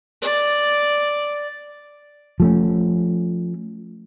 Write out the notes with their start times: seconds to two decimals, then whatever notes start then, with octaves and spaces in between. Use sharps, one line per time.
0.22 D5
2.40 F3 A3 C#4